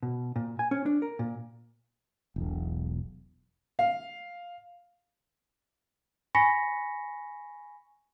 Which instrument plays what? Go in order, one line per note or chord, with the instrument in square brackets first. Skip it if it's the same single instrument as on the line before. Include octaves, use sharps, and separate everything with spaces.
[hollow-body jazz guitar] B2
A#2
G#5
C#4
D4
A#4
A#2
[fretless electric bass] E1 B1
[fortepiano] F5
[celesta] G#5 B5 C#6 A#6 B6 C#7